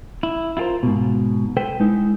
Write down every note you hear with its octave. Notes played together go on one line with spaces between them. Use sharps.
E4
E4 F4 G4 A#4 C5
G#2 B2
A4 B4 C5 G5
G#3 D#4 E4